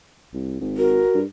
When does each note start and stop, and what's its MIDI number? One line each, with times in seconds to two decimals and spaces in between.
0.33 0.61 36
0.61 1.01 32
0.77 1.18 66
0.77 1.19 70
1.15 1.25 43